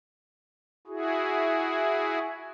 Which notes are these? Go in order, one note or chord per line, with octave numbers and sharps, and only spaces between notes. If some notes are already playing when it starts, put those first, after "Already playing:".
E4 F#4 G#4